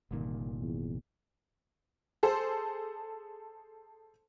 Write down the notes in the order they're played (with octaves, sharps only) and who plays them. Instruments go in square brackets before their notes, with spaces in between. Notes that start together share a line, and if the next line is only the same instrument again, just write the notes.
[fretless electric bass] G1 D#3 [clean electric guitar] C2 A#2
[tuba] E2
[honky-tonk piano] G#4 A4 C5